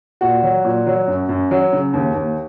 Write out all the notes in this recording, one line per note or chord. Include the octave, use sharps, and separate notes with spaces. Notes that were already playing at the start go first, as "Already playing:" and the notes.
A#2 F#4
F#3
A#2
F#3
F#2
F#2
F#3
C#3
D#2
D#2